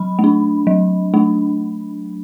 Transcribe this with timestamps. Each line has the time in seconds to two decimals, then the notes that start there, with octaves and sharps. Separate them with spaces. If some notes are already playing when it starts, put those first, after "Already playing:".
Already playing: F#3 B5
0.19 A3
0.24 D4
0.67 F#3
1.14 A3 D4